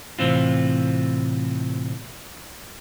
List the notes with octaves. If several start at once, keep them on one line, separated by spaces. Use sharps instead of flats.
A2 C3 E3 C4 F4